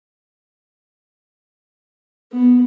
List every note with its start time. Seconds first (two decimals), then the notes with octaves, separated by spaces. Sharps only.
2.32 B3